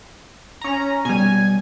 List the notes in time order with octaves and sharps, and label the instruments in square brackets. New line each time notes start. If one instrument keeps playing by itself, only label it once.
[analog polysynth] C#4 A#5
[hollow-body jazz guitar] B2 G3 [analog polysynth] G#5